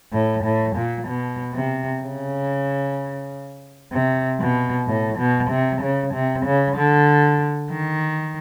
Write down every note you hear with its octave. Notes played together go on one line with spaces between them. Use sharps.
A2
A2
A#2
B2
C3
C#3
C3
B2
A2
B2
C3
C#3
C3
C#3
D3
D#3